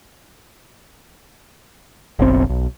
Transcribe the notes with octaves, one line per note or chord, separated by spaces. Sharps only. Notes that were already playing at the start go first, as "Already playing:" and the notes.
F#1 B1 C4
B1